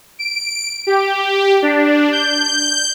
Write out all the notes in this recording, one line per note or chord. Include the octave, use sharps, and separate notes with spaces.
D7
G4
D4
G6